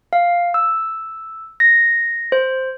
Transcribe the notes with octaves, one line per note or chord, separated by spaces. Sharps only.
F5
E6
A#6
C5